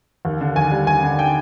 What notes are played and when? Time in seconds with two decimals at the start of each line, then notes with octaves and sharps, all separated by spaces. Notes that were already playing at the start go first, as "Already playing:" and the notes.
0.25 D#2
0.41 D3
0.56 D#2 G#5
0.72 G3
0.87 D#2 G#5
1.03 D3
1.19 G5